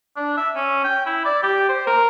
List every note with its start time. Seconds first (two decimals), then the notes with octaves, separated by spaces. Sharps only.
0.17 D4
0.37 E5
0.55 C#4
0.84 G5
1.06 E4
1.25 D5
1.43 G4
1.69 C5
1.87 A#4